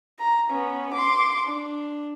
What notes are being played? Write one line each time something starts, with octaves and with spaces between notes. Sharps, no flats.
A#5
B3 C#4
C6 D6
D4